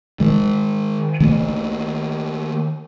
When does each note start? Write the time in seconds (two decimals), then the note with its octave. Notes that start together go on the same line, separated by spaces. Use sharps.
0.20 D#3 G#3
1.20 D#3 A3 A#3